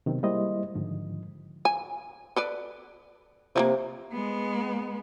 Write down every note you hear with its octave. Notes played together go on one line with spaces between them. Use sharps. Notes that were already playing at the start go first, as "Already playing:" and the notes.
C3 D#3 F#3 B3 C4
G3 G#3 A#3 E4 C5 D#5
G#2 D3 D#3 F3
G#5
A4 B4 D5
C3 F3 G3 A#3
G#3 B3